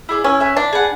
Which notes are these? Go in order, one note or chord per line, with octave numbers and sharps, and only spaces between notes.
E4 G#4 D5
C#4 E4
B4 E5 G#5
D4 E4
G#4 B4 F#5